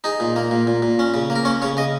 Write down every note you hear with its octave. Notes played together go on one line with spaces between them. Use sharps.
D#4 G#4
A#2
A#3
A#2
A#2
A#2
C#4
C#3
A#3
A#4
C#4 C#5
C#3 C#5
C#3 D#5